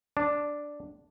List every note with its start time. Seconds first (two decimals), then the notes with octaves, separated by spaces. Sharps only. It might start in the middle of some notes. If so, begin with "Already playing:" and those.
0.17 D4